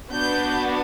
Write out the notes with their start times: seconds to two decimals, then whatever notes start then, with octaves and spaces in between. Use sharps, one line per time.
0.11 B3 D4 F#4 G6